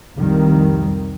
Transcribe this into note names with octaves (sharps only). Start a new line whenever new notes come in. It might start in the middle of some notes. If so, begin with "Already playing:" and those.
C2 F2 D#3 G3